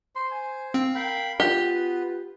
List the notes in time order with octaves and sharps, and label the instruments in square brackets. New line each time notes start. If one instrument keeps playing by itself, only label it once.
[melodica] C5 [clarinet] C6
[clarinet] G#5
[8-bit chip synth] C4 [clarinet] F5
[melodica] A#4 F5 B5 [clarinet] G5
[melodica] B3 B4 [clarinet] F4 [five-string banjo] G4